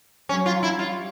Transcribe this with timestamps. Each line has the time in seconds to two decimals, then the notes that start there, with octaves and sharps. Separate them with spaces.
0.29 F#3 C#4
0.46 F4
0.63 E4
0.79 G3 F4